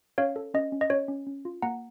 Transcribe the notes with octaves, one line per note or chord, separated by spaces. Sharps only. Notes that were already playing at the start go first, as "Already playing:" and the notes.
C#4 C#5 F5
A4
C#4 D#5
C#4
D#5
C#4 C#5
C#4
C#4
F4
A#3 F#5 A#5